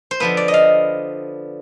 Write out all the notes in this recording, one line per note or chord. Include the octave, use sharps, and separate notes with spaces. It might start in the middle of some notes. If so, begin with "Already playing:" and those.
C5
D3 F3 B3 B4
D5
D#5
F5